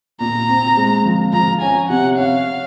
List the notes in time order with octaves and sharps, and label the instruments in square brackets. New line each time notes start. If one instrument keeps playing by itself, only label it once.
[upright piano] A#2 [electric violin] A#5
[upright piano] C4
G#3
F3
[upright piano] F3 [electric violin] A#5
[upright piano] C#4 [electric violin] G#5
[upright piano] C3 [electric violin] F#5
[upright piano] C#4 [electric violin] F5